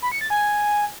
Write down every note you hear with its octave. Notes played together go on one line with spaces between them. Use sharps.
B5
C#7
A6
G#5